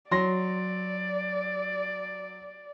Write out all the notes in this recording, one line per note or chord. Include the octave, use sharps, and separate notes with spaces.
F#3 D5 C6 A#6